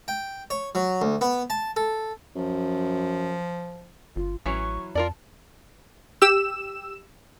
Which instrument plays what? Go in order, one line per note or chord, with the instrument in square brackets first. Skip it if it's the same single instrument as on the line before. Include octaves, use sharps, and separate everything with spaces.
[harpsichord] G5
C#5
F#3
D2
B3
A5
A4
[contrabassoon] F#2 [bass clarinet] F3
[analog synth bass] G1 [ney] F4
[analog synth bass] A1 [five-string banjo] E3 F#3 C#4 [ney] C#6
[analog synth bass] F2 [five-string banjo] F4 A#4 D5 [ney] A5
[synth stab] G4 E6 E7